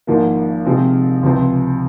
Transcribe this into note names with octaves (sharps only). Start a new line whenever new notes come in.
G#1 G#2 F3 A#3
C3 F3 G#3 C4 F4
C#2 C3 F3 C4